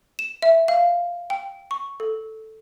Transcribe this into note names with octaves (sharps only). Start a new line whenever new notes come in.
E7
E5
F5
G5
C#6
A4